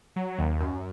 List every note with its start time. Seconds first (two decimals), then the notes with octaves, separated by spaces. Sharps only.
0.16 F#3
0.39 D#2
0.60 F#2